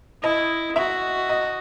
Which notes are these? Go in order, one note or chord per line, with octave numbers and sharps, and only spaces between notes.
E4 D#5
F#4 E5
D#5